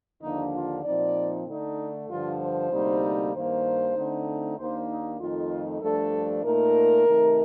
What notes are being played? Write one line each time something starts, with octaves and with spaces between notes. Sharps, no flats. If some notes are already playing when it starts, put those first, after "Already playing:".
D#2 D3 F3 A#3 D4 D#4
F4
A#2 F3 C4 D#4 D5
D3 A3 D4 D#4
G2 D3 F3 F4
C5
D2 C3 G3 A#3 D#4
G2 D#3 A#3 C5
D3 A3 C4 D#4
D#2 D#3 A#3 D4 C5
D#4
F2 D#3 A3 D#4 F4
G2 F3 A3 D4 A4
A#2 A3 D#4 A#4
C3 D#3 A3 D#4